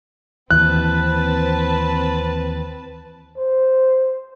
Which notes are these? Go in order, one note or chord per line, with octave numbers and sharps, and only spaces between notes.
D#2 E3 C4 B4 A5 F#6
C5